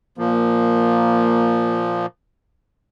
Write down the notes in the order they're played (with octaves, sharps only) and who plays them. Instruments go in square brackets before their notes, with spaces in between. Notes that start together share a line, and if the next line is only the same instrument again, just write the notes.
[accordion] A#2 F3 [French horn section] A#3